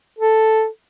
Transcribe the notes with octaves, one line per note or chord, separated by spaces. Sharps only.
A4